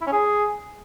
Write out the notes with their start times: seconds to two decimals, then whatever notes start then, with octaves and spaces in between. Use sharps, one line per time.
0.02 E4
0.07 C#4
0.12 G#4